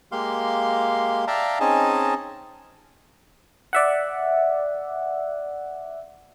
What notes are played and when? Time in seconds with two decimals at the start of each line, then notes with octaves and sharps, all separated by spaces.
0.12 G#3 A#3 G4 F5 C6
1.27 D5 E5 F5 G5 A5 A#5
1.60 C4 C#4 D#4 G#4 D#5 A5
3.73 D5 E5 F#5